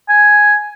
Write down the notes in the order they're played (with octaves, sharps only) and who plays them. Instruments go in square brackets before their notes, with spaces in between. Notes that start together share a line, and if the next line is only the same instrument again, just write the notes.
[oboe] G#5